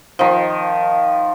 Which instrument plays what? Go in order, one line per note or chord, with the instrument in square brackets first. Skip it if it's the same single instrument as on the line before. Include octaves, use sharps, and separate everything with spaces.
[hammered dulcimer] D#3 F3